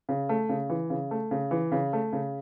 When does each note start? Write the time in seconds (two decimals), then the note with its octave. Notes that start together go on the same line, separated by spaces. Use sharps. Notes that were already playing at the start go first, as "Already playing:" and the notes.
0.09 C#3
0.29 A3
0.49 C#3
0.70 E3
0.90 C#3
1.11 A3
1.31 C#3
1.51 E3
1.72 C#3
1.93 A3
2.13 C#3